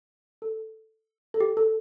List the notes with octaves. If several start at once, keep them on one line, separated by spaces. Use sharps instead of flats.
A4
A4
G4
A4